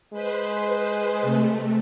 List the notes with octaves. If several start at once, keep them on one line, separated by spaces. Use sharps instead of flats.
G#3 B4 C5
C3 A3